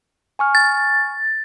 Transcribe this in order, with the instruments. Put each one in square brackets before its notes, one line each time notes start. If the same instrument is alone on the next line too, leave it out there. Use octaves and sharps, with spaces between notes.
[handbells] G#5 C#6 F6
[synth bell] A6